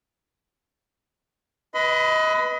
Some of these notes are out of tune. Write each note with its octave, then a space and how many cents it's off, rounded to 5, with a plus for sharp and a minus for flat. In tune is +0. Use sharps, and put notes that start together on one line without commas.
B4 +0 D#5 +25 B5 +45